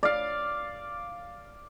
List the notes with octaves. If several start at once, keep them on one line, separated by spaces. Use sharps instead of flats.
D5 F5